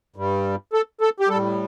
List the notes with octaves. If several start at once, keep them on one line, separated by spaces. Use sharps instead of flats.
G2 G3
A4
A4
G4
G3 A4
A2